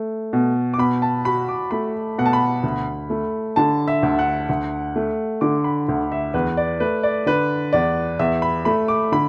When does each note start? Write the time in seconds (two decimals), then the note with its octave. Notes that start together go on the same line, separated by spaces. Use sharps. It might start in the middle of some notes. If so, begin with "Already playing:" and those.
Already playing: A3
0.33 B2
0.74 D6
0.78 B2 B5
1.02 A5
1.25 F#4 B5
1.48 D6
1.71 A3 B5
2.18 B2 F#5
2.26 A5
2.33 B5
2.63 D2
3.10 A3
3.56 D3 A5
3.88 E5
4.03 D2
4.19 F#5
4.49 D2
4.96 A3
5.41 D3 D6
5.64 B5
5.88 D2
6.12 E5
6.34 E2 B4
6.57 D5
6.80 A3 B4
7.03 D5
7.26 D3 B4
7.73 E2 D5
8.19 E2 E5
8.42 B5
8.65 A3 B5
8.88 D6
9.12 D3 B5